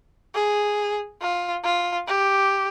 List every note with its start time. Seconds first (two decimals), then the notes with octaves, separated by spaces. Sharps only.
0.35 G#4
1.21 F4
1.64 F4
2.07 G4